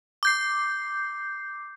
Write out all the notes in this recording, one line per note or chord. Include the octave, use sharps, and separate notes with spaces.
D6 G6 C7